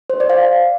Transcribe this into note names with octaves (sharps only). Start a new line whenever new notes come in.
C5
D5
F5